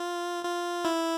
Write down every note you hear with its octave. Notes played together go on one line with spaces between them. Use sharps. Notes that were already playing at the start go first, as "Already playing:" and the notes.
Already playing: F4
F4
E4